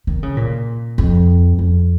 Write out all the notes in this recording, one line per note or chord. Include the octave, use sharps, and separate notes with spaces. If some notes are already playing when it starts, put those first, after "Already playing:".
D#3
C#3
A#2
F2
F2